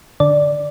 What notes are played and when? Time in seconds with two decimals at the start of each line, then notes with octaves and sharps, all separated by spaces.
0.20 D3 D5